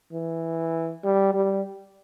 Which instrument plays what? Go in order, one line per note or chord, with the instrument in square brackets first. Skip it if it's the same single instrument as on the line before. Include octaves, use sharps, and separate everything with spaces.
[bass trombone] E3
G3
G3